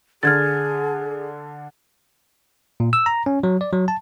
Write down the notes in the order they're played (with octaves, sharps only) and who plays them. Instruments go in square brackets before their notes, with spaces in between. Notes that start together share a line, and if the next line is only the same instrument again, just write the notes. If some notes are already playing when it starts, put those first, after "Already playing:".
[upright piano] D3 D4 A4 [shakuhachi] G#4 [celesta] F6 G#6 A6
[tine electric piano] A#2
E6
A#5
C#4
F#3
D5
F#3
A5